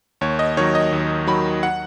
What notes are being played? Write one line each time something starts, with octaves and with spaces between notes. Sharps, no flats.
D#2 C#5
D#5
D#3 F#3 C#5
D#5
D#2
D#3 F#3 B5
F#5